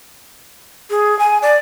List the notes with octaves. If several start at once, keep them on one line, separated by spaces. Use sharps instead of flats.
G#4
G#5
D5